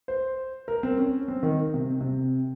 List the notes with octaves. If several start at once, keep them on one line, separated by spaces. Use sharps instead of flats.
C5
A#4
C4
C#4
C4
D#3
C3
C3